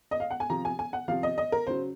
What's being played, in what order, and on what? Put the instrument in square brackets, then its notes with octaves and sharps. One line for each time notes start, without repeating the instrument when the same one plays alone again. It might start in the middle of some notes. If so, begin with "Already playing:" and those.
[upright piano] D#5
F5
F#5
G#5
C3 F3 A#5
G#5
G#5
F#5
C3 F3 F5
D#5
D#5
A#4
C#3 F#3 C5